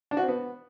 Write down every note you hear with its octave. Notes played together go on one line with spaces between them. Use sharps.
D4
F#4
C4
B3